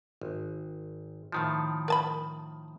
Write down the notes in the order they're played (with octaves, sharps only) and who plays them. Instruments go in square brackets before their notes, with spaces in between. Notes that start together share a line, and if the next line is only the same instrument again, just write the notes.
[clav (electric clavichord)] G#1
A2 D#3 F3
[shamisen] A#4 A5 B5